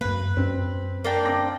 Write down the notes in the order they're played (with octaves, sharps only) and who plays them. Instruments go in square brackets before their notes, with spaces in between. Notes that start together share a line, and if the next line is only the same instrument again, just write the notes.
[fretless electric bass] F#2 A#3 [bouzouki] B4
[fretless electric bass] F#2 [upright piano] C4
[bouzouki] A#3 D4 G5
[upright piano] C4 D6 A#6